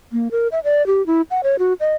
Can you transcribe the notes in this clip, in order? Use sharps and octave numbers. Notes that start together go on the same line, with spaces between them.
A#3
A#4
E5
D5
G4
E4
F#5
C#5
F#4
D#5